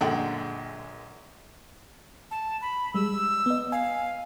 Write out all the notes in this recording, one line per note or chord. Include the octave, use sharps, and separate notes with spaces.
A#1 F#2 D3 G#3 F#5 G5
A5
B5
G3 G#3 E6
B3 D#5
F5 G#5